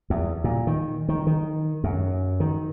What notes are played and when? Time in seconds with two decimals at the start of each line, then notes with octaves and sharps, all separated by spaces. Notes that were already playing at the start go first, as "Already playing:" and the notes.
0.10 E2
0.44 A#2
0.67 D#3
1.09 D#3
1.27 D#3
1.84 F#2
2.40 D#3